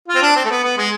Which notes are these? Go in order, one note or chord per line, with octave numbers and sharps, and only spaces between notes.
F4
C4
D4
C4
A3
B3
B3
G#3